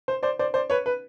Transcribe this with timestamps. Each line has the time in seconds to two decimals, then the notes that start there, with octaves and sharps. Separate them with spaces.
0.08 C5
0.23 C5 D5
0.39 C5 D5
0.54 C5 D5
0.70 B4 C#5
0.86 B4